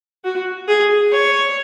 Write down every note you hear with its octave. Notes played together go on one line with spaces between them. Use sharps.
F#4
G#4
C#5